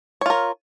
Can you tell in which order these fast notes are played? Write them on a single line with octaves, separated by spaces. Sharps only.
C#5 F4 A#4